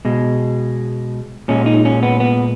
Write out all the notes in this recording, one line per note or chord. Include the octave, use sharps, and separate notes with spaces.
B2 G#3
A#2 G#3 C#4
D#4
C#4
B3
B3